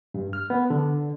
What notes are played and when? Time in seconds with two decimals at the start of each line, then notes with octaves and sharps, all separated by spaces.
0.14 G2
0.33 F6
0.50 B3
0.70 D3